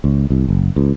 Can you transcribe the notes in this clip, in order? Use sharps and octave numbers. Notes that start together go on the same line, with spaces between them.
C#2
C2
F#1
C#2